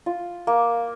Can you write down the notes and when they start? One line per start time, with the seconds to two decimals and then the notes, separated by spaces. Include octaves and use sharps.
0.06 F4
0.47 A#3